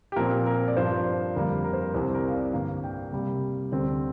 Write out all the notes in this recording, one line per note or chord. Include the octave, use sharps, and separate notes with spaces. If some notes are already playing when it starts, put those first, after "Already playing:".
G4
A#2 F3 C4 A#4
A#4
D5
G2 F3 D4 C5
F2 D3 G3 A#3 A#4
A#4
C5
A#4
C2 C3 G3 C5
A#4
F5
D5
G2 D3 A#3 F5
G5
C3 G3 A#3
D2 D3 G3 C4